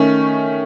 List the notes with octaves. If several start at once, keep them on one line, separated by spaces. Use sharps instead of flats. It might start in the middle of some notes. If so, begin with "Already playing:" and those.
Already playing: D#3 A3 C#4